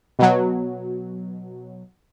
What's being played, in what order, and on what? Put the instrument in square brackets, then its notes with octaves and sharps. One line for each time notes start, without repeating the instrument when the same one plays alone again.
[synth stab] B2 F#3